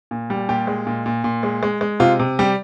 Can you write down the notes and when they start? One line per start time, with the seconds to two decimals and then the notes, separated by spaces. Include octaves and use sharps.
0.11 A#2
0.30 G3
0.49 A#2 G4
0.67 G#3
0.87 A#2
1.06 A#2
1.24 A#2
1.43 G#3
1.63 G#3
1.81 G#3
2.00 C3 F4
2.19 C3
2.39 G3 G4